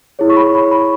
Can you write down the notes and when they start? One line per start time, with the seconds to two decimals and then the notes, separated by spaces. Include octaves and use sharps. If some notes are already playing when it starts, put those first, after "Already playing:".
0.19 E4 G#4 C#5
0.30 C#6
0.37 B5
0.55 B5
0.72 B5